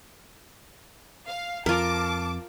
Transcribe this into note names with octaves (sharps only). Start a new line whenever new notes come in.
F5
F2 F4 A#4 A5 D6